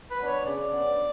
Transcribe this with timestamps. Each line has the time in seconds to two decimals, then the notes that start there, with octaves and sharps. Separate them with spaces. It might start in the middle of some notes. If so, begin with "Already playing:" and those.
0.10 B4
0.19 F#3 B3 D4
0.27 C#5
0.45 C#3 D5
0.69 F#3 B3 D4